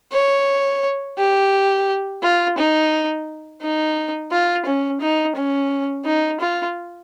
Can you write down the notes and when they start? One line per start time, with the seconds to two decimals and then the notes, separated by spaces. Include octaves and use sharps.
0.13 C#5
1.18 G4
2.23 F4
2.57 D#4
3.61 D#4
4.32 F4
4.66 C#4
5.00 D#4
5.35 C#4
6.05 D#4
6.40 F4